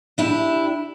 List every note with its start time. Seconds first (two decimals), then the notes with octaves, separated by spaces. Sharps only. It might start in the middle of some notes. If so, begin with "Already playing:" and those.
0.18 D4 E4 G4